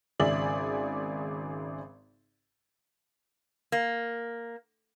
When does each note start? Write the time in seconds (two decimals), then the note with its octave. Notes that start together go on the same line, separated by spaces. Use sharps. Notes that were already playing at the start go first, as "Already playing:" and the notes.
0.20 G#1 C#3 G#4 D5 E5 F#7
3.72 A#3